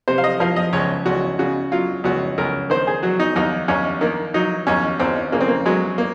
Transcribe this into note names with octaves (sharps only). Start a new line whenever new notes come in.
C3 C5
F5
D#5
F3 F5
D#5
C#2 C#5
C#2 F#4
C#3 F#4
F#3 F4
C#2 F#4
C#2 A#4
D#3 C5
G#4
F#3 F#4
D#4
D#2 D#4
D#2 C#4
D#3 A#3
F#3 D#4
D#2 C#4
D#2 C4
C#3 A#3
C4
A#3
F#3 G#3
A#3